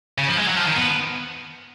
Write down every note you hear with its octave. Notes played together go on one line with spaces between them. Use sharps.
C#3
F3
G#3
F#3
F3
D#3
B3